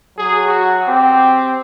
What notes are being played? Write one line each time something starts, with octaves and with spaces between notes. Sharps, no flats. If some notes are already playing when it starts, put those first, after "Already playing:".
F#3 G#4
F#4
C4 G4